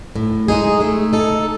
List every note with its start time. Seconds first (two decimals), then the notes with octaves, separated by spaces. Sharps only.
0.16 A2
0.48 G#3 D#4 G#4
0.81 A3
1.13 D#4 A4